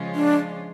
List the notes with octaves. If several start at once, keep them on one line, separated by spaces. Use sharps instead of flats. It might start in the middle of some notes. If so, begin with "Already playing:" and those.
Already playing: C#3 F3 G#3 C#4 F4
D4